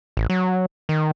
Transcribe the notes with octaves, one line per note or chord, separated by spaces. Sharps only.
A1
F#3
D#3